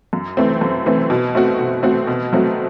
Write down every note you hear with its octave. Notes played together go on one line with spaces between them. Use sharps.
F#2
E3 A3 C4
F#2
E3 A3 C4
B2
A3 C4 F#4
B2
A3 C4 F#4
B2
F#3 A3 C4 F#4